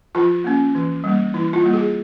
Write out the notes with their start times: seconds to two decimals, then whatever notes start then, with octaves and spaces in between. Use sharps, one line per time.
0.15 F3 F4
0.44 A#3 C#4
0.75 E3
1.04 G3 A#3
1.34 E3 E4
1.53 F4
1.64 G3 A#3
1.73 G#4